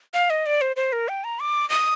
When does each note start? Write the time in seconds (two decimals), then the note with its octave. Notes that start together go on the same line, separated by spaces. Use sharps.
0.14 F5
0.30 D#5
0.46 D5
0.61 C5
0.76 C5
0.92 A#4
1.09 G5
1.24 A#5
1.40 D6
1.70 D#6